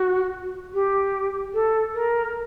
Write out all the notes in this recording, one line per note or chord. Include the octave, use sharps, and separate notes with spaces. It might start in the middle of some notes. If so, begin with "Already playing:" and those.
Already playing: F#4
G4
A4
A#4